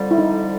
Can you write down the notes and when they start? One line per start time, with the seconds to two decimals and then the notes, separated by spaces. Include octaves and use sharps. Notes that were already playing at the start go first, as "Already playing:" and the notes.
Already playing: F2 D3 G3
0.11 E4
0.18 D#4